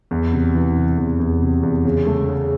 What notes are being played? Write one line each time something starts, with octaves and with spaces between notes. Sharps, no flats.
E2
C3
E3
C3
E2
E2
C3
E2
C#3
A3
C#3